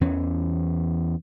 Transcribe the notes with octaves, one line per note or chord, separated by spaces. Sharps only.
E2 E3 C#4